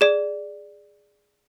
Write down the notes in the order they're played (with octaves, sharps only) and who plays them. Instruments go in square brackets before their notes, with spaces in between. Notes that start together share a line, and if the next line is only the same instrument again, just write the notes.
[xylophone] G#4 D5